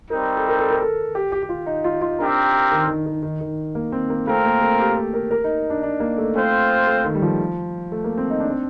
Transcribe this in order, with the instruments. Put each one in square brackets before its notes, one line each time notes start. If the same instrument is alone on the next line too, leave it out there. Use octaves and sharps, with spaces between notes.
[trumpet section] G3 C4 D#4 [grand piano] A#4
[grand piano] A4
A#4
A4
A#4
A4
G4
G4
G4
F4
D#4
F4
F4
[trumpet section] C4 G4 A#4 [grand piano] D4
[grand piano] D#3
D#3
D#3
D#3
D#3
A#3
C4
A#3
[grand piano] A3 [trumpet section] C4 F4 A#4
[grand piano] A#3
A3
G4
A4
A#4
A#4
D#4
D4
D4
A#3
A3
[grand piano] A3 [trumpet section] C4 F4 C5
[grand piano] A3
D#3
G3
F3
A3
A#3
C4
D#4
D4
C4